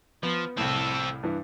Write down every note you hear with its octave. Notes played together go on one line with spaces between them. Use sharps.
F3 B3
C2 A2 C4 A4
G2 E3